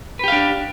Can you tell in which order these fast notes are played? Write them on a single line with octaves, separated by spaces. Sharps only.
B4 G4 F5 D4